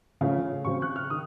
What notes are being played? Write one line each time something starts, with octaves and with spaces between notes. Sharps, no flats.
C#3 F3 A3 C#4 F5
C#3 F#3 C4 C#6
F#6
F6
D#3 D#6